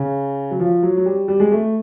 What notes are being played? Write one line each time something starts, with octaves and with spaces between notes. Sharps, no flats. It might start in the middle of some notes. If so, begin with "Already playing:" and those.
Already playing: C#3
F#3
F3
F#3
F#3
G3
G3
G#3
A3